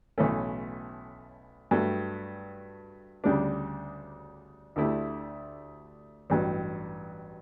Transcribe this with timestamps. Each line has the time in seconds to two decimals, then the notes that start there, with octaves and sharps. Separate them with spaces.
0.18 B1 A2 E3 A3 C#4
1.71 G2 F#3 A3
3.24 D2 C#3 G3 D4
4.76 D2 D3 A3 E4 G4
6.30 A1 G2 F#3